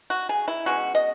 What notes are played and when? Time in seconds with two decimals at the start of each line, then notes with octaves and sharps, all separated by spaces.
0.10 F#4
0.29 G#4
0.48 E4
0.66 B2 G#3 C#4 F#4
0.95 D#5